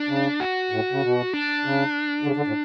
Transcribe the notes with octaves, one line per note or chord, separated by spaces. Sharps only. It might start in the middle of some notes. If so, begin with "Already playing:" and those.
Already playing: D4
C#3
F#4
A2
C#3
B2
D4
C#3
D3
C#3
D3
A2